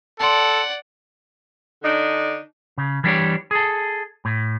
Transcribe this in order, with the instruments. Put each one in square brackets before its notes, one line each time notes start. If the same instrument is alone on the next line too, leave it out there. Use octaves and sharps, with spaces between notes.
[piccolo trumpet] A4 [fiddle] D5 F#5 [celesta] A5 C6
[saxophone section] D3 D4 D#4
[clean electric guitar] C#3
E3 G3 D4 E4 G4 C#5
G#4 A4
A2